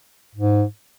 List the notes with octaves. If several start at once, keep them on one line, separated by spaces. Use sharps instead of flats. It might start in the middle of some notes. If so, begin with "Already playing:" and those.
G#2